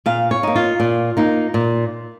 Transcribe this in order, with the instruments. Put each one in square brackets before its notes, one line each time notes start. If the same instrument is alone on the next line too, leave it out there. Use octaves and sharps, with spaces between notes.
[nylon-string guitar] A#2 F5
C#5
A#3 D#4
F4
A#2
A#3 D#4
A#2